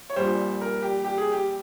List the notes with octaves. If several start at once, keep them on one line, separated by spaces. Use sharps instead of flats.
C#5
A#1 A#2 G3 C5
A#4
G4
G4
G#4
G4